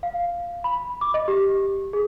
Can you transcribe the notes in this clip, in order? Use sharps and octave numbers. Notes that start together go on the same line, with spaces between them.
F5
B5
D6
D#5
G4
G#4